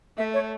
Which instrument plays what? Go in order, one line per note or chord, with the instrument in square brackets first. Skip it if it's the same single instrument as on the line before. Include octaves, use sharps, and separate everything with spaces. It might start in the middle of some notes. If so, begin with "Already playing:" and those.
[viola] A3 [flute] E5
[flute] C#5